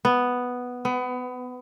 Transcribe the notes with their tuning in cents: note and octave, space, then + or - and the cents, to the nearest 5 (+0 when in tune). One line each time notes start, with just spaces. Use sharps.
B3 +0
B3 +25